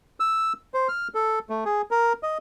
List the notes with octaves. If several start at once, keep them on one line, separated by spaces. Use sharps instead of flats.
E6
C5
F6
A4
A3
G#4
A#4
D#5